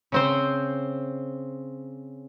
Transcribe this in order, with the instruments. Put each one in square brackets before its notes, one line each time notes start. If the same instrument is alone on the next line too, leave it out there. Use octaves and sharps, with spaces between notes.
[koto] C#3 C4 C5